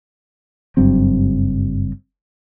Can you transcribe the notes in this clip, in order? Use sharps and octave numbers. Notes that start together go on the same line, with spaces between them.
F#1 G2 F#3 C4